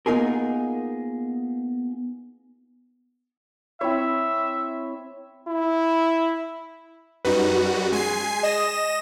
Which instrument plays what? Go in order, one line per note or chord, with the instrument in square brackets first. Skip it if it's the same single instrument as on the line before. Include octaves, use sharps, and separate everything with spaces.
[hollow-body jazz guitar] A#3 B3 D#4 F4 G#4 A#4
[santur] C4 E4 C#5 [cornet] E5
[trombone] E4
[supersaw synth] F#2 G3 F#4 [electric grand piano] D#4 B4
[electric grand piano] G#3 [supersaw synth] G#5 C7
[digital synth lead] D#5 [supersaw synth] A#6 E7